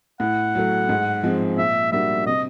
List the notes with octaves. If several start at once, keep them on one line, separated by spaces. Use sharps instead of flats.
A2 F#5
F#3 A3
G#2
F3 G#3 C4
A#2 E5
G3 A#3 D4 F#4 E5
C3 D#5